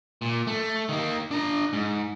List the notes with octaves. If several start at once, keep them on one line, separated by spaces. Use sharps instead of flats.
A#2
A3
D#3 A#3
D4 A#5
G#2